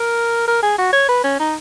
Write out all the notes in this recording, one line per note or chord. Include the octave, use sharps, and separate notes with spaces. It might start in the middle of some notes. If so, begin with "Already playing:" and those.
Already playing: A#4
A#4
G#4
F#4
C#5
B4
C#4
D#4